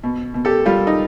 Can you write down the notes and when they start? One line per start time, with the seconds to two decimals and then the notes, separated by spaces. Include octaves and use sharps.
0.04 B2
0.34 B2
0.45 G4 A4
0.66 G3 F4 G4
0.87 D#4